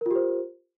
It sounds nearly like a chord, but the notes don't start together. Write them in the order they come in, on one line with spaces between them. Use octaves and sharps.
A#4 F4 G4 C5